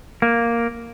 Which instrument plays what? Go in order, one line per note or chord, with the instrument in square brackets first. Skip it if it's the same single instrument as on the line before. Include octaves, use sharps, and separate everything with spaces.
[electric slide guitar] A#3